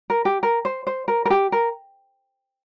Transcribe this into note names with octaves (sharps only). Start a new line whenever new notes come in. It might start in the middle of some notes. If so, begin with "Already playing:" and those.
A#4
G4
A#4
C5
C5
A#4
A#4
G4
A#4